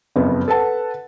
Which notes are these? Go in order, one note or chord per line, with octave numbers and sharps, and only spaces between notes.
F#1 F2 B3
A4 B4 F#5 A5